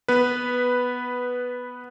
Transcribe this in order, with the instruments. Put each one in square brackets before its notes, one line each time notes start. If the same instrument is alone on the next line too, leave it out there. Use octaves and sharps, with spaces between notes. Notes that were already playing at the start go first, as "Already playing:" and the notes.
[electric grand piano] B3 B4